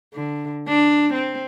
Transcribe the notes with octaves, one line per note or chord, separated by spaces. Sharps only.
D3
D4
C4